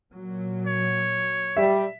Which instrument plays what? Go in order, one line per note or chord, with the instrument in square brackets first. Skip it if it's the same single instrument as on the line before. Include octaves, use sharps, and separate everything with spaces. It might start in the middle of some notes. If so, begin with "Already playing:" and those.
[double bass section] A#2 F#3
[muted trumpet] C#5
[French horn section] G3 [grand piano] E5 B6